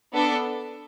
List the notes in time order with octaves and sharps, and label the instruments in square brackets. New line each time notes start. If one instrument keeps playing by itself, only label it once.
[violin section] B3 D4 A4